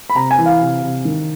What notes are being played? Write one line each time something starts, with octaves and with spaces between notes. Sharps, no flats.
B5
C3 A#5
G#5
E3
F5
C3
C3
D#3